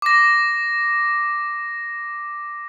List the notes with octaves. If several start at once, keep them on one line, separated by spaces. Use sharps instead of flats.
D6 A#6